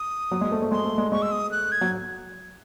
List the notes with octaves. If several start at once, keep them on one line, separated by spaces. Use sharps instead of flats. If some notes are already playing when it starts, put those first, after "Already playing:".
Already playing: D#6
F#3
G#3
A3
A3
G#3 C6
A3
G#3
G#3 C#6
E6
D#6
F#6
G#6
F#3